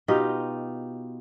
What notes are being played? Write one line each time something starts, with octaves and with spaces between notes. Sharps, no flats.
B2 D#4 F4 G4